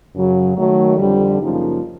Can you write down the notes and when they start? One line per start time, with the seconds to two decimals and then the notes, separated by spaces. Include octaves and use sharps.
0.15 F#2 C#3 F#3
0.56 D#3 F#3 A3
0.97 F2 D3 G3
1.39 F#2 C#3 F3 A#3 D#4